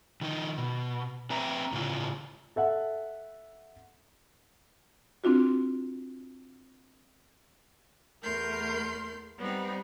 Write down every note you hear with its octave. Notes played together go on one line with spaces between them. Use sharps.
D#3 F3 D#4
B2
C4 B4 E5 A#5
A2 C#3 E4 F4
A4 E5 F#5
C4 D4 F4 F#4
E2 A3 A#4 C6 G6
G3 B3 C4 D#4